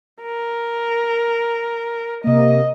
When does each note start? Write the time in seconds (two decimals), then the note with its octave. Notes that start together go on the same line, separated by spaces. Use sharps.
0.22 A#4
2.24 C3 A#3 D#5